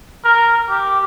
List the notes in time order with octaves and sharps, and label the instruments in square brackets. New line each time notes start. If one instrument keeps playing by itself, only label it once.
[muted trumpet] A#4
G4